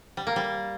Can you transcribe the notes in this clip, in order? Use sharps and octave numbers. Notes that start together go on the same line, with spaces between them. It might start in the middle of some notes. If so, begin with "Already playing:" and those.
G3
A#3
G3